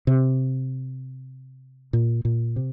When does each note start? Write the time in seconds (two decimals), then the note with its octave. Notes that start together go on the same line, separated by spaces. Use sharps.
0.07 C3
1.93 A#2
2.25 A#2
2.56 C3